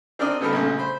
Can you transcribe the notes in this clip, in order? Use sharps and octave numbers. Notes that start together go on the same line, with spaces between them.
C4 D4 A#4 D5 D#5
C#3 G3 B3 A4 A#4 B5
A#1 C#3 A3
C5 B5